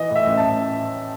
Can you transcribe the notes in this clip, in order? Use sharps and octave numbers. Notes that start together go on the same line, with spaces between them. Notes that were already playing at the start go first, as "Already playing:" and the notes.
Already playing: E3 D#5
A2 E5
A1
A5
A1